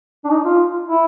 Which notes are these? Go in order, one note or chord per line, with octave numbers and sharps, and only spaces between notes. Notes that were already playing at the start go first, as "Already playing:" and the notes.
D4
D#4
F4
E4